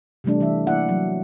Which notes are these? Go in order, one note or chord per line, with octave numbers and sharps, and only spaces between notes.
C3 E3 G3 A3 D4
E3 A3 E5
A#3 E4 D5 E5 F#5
F#3